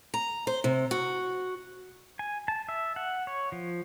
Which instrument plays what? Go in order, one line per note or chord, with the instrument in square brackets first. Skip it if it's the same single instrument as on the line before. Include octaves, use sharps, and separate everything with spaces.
[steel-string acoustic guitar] A#5
C5
C3
F#4
[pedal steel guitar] G#5
A5
E5
F#5
C#5
F3